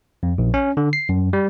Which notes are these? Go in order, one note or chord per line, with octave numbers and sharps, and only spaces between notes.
F2
A#1
C#4
D3
C7
F#2
G3